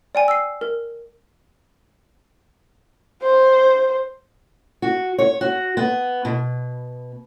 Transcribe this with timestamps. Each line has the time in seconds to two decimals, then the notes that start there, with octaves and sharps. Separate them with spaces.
0.15 D5 G5 G#5
0.28 E6 C7
0.61 A#4
3.22 C5
4.82 F#4
5.18 C#5
5.41 F#4
5.77 B3
6.25 B2